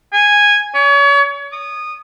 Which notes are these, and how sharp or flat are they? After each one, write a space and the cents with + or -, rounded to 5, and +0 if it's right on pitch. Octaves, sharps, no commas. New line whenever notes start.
G#5 -10
C#5 +35
D#6 -20